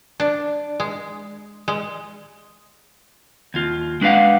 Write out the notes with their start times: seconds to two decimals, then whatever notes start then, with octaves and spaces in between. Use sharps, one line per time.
0.20 D4
0.80 G#3
1.68 G#3
3.54 D#2 F4
4.01 G#3 D4 B4 C5 F5 F#5